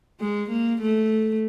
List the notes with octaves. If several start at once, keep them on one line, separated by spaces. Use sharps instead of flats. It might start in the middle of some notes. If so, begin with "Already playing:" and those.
G#3
A#3
A3